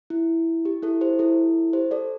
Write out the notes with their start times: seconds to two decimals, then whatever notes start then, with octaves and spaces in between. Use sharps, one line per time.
0.10 E4
0.65 G4
0.83 E4 A4
1.01 G4 C5
1.19 E4 A4
1.73 G4 C5
1.91 A4 D5